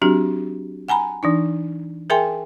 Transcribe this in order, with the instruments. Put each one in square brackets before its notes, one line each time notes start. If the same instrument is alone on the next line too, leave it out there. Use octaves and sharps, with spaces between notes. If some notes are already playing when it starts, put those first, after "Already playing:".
[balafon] F#3 C4 D4 F#4 G4
F#5 G#5 A#5 B5
E3 D4 D#4
G#4 A#4 E5 G5 G#5 C6